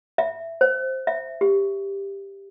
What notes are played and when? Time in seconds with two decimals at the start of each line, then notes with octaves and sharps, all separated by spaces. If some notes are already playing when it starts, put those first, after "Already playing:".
0.18 E5
0.61 C5
1.07 E5
1.41 G4